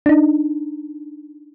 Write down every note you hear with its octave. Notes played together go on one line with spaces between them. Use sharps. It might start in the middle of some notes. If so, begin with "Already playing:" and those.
D4 D#4